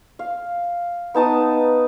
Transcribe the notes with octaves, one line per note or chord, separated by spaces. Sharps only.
F5
B3 D#4 A5 D#6